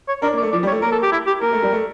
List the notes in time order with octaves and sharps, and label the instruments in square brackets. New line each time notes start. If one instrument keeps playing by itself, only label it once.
[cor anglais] C#5
[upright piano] D4 [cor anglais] A#4
[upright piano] A#3
[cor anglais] D5
[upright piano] A3
[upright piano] F3 [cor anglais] D5
[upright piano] G3
[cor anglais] C#5
[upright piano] A3
[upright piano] A#3 [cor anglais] A#4
[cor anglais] A4
G4
E4
G4
[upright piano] A#3 [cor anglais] A#4
[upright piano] A3
G3
A3